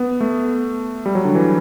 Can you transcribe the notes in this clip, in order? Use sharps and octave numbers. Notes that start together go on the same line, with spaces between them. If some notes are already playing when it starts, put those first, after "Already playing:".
Already playing: B3
A3
G3
F#3
D3
E3